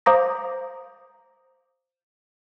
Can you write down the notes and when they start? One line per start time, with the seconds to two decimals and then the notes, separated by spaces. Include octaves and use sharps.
0.06 C5 F5 A#5 D6 D#6 A#6